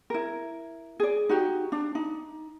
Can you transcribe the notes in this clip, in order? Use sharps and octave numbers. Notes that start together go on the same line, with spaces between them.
E4 A#4
G#4 D5
D#4 F#4 G4
D4
D#4